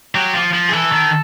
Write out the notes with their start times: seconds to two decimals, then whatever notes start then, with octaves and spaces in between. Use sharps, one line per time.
0.15 F#3 G4
0.35 F3
0.53 F3
0.69 G#4
0.73 E3 A4
0.92 D#3